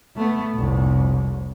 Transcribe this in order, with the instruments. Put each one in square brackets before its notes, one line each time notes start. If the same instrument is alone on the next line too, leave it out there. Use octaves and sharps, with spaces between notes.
[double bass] A3 B3
F1 C2